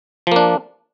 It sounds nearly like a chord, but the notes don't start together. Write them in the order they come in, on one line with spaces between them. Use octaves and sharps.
F3 A#3 D4